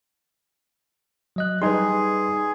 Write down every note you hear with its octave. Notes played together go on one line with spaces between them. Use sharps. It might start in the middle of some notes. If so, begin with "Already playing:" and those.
F#3 D#5 F#6
G3 D#4 G#4 B4 C6